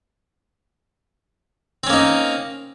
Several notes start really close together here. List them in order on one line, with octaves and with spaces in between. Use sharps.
C4 C#4 A#3 D#4